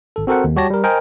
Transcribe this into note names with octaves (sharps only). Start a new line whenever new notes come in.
G#1 A4
C4 F#4 A4 A#4 C5 F#5
D#2
G3 F#4 G4 C#5 A5 A#6
G3 A#4
A#4 C5 D#5 G5 G#5